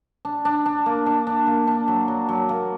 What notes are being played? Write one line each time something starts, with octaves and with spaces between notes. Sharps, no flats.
D4
D4
D4
A#3
D4
D4
A#3
D4
F#3
F#3
F#3
A#3